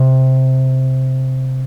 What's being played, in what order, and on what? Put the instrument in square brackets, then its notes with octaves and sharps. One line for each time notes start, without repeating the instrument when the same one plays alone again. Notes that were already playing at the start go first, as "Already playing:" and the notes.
Already playing: [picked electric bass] C3